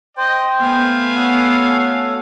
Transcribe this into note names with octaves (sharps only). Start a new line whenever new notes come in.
C5 D#5 G5
A3 B3 F5 G#5
C#4 F#4 A4 F#5